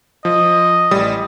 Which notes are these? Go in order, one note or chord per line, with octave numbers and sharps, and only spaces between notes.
F3 D#5
A1 G3 D#6